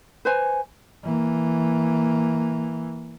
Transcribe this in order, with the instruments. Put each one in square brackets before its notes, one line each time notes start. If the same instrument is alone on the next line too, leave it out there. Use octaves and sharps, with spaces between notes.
[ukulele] B4 C5 G#5
[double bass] E3 A#3